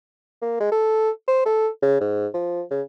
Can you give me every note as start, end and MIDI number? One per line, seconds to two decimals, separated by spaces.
0.42 0.59 58
0.60 0.68 56
0.72 1.10 69
1.28 1.42 72
1.45 1.68 69
1.82 1.99 49
2.01 2.27 44
2.34 2.62 53
2.71 2.82 49